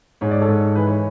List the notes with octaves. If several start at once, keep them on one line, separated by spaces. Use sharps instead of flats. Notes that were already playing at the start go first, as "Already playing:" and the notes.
G#2 C#5
D5
A4 C#5
G#2
E3 B4
C#5